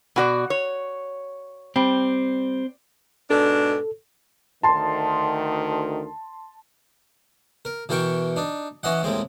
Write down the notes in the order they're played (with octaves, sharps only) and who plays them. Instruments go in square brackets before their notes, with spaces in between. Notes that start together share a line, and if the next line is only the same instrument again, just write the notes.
[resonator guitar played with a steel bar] B2 F#4 D5
C#5
[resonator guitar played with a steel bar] G3 [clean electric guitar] C4
[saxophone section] G#2 B2 D4 [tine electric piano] A4
[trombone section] D2 D#3 [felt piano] A5 C6
[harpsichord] A#4
B2 E3 A#4 G5 C#6
D4 D#4
E3 C#4 D#5 F#5
D#2 A2 G#3 C4